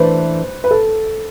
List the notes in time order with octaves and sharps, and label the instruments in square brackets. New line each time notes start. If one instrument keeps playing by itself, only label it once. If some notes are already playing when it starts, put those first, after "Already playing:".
Already playing: [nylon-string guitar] E3 A3 D4 [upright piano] B4 C5
[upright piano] B4
A4